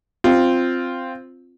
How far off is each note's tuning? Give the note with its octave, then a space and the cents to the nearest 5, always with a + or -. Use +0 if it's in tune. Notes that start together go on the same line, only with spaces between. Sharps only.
C4 +0 F4 +0